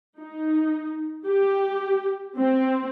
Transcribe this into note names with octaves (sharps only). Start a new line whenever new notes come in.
D#4
G4
C4